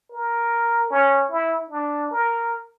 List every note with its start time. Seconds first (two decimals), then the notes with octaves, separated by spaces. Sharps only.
0.11 A#4
0.91 C#4
1.31 E4
1.70 D4
2.11 A#4